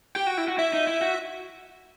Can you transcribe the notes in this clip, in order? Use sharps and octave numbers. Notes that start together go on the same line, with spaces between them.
G4 G5
F#4
E4
F#4
E4 E5
D#4
E4
F#4